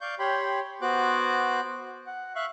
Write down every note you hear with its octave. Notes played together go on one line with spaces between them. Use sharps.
D5 F5 C#6 G6
G4 C#5 G5 B5 C6
B3 F#4 C5 D6 F#6
F#5
E5 F5 C#6 F#6